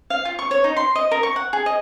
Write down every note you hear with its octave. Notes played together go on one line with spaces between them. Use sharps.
F5
F4
C#6
C#5
D#4
C6
D#5
A#4
C#6
F#5
G#4
D#5